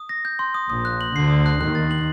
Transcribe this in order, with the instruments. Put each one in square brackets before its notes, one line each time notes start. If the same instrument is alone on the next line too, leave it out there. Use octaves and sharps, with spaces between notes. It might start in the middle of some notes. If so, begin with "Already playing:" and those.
Already playing: [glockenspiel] D#6
A#6
G6
C6
D#6
[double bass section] A#1 A#2 [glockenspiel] D#6
[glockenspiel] F#6
F#7
[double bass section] D2 D3 [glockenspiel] C7
[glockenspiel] D#6
F#6
[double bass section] D#2 D#3 [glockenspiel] F#6
[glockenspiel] A6
F#7